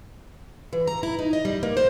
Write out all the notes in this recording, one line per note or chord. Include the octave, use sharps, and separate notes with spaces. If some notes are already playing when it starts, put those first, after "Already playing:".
E3
A#5
E4
D#4
D#5
G3
A#3
C5